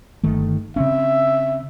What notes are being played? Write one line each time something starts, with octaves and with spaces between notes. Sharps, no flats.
G1 D#3 A3
C#3 C4 C#4 E5